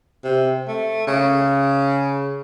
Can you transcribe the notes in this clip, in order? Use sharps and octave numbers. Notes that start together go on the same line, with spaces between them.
C3
A3
C#3